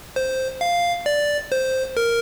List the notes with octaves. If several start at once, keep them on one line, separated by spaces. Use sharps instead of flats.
C5
F5
D5
C5
A#4